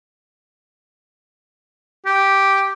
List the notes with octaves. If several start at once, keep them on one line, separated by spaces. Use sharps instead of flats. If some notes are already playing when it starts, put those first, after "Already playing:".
G4